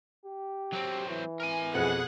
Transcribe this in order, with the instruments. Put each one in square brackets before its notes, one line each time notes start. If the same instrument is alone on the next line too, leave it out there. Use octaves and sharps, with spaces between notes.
[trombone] G4
[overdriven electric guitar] F#3 C4
[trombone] E3
[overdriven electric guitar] A#4 G#5
[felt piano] F2 [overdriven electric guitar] B2 [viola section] G#4 F#5